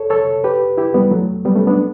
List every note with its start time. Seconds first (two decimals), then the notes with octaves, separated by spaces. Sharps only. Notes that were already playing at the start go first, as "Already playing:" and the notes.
Already playing: A4 C#5
0.10 A4 C#5
0.44 G4 B4
0.78 E4 G4
0.94 G3 B3
1.11 F#3 A3
1.45 G3 B3
1.56 A3 C#4
1.67 B3 D4